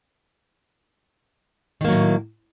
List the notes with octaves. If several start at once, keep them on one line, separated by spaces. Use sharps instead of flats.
A2 D#3 F#3 A#3